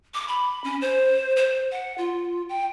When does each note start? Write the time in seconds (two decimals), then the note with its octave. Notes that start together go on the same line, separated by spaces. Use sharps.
0.14 D6
0.28 B5
0.64 C#4
0.81 C5
1.36 C5
1.72 F#5
1.98 F4
2.49 G5